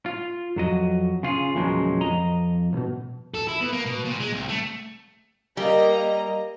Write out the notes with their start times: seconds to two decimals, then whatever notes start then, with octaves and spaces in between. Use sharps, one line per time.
0.06 F4
0.56 F2 F#3 D#5
1.23 C#3 F4 G#4
1.55 E2 A#2 C#3 F3 F#3 G#3
2.01 F2 D#5 A#5
2.73 B1 B2
3.34 A4
3.48 E4
3.61 B2
3.73 A#3
3.86 B2
4.05 A#2
4.20 G#3
4.33 C2
4.49 A3
5.57 G3 A#3 D#5 A#5